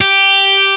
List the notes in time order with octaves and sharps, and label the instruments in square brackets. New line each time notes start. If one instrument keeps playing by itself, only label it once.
[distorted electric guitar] G4